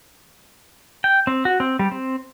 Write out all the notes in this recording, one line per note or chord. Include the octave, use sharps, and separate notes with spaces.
G5
C4
F#4
C4
G3
C4